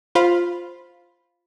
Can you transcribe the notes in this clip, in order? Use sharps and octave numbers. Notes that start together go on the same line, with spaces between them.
F4 C5 F5 B5